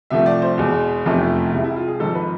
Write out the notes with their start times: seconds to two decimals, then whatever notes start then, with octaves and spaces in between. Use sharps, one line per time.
0.10 C2 C3 F3 A3 E5
0.26 D5
0.42 C5
0.58 E2 B2 G#3
1.06 F1 E2 C3 F3 A3
1.53 C2 C3 G#3 E4
1.64 E4
1.76 F4
1.88 G#4
2.00 G#1 G#2 F3 A4
2.15 B4